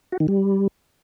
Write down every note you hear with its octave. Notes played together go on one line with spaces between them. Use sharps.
F#4
D#3
G3